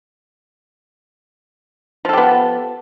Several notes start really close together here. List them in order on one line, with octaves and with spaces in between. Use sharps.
F3 A4 G4 B3